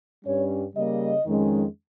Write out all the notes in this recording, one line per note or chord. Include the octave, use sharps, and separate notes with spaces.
G2 G3 C#4 C#5
C#3 G3 A#3 D#5
F2 D#3 G#3 C#4